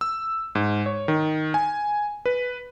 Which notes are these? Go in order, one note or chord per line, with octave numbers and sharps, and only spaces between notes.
E6
G#2
C#5
D#3
G#5
B4